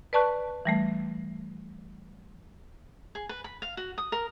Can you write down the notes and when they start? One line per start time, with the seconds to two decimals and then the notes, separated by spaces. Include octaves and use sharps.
0.13 B4 D5 A5 C#6 F#6
0.65 E3 G3 A3
3.15 G#4
3.29 B4
3.44 B5
3.62 F5
3.77 F#4
3.98 D#6
4.12 A#4